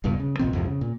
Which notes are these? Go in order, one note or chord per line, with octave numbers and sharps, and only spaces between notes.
D#1 C#2 G2 B2
C#3
C2 A#2 D#3 C4
C2 F2 G#2 C3
C#3
A#2